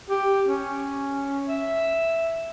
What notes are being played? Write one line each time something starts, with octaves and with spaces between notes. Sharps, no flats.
G4
C#4
E5